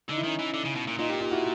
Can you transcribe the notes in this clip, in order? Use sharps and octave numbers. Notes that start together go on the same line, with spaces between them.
D3 D#4
E4
D#3 C#4 D#4
E3
D3
C#3
B2
A#2
A#2 D#4 F4
F4 G4
F4 G4
E4 F#4